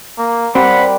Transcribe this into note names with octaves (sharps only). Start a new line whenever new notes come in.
A#3
G3 C4 G4 A#4 F#5 B5